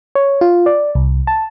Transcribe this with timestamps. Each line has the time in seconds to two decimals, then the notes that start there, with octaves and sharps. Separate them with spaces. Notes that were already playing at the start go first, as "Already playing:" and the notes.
0.15 C#5
0.41 F4
0.66 D5
0.95 C2
1.27 A5